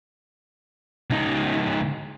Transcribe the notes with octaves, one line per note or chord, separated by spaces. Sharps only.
C#2 D#4